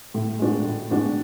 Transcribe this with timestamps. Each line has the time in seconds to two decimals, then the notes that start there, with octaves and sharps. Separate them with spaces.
0.14 A2
0.39 G#3 D4 F#4
0.65 A2
0.90 G#3 D4 F#4